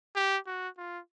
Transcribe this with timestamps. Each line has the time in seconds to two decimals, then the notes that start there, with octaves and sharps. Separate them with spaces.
0.16 G4
0.46 F#4
0.78 F4